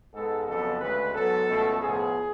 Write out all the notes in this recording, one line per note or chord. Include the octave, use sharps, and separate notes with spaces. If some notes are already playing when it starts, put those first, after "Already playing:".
G#2 G#3 B3 A4
F2 C#3 F#3 B3 A4
D2 C#3 G#3 B4
G#2 F#3 B3 A4
C#2 B2 A3
A2 F3 B3 G#4